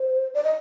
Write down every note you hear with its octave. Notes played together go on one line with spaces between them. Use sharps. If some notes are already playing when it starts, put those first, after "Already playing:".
Already playing: C5
D5
D#5